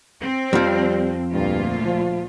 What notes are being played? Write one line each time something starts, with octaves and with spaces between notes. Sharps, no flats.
C4
F2 F3 G3
D2 G2 A#2 F4
F3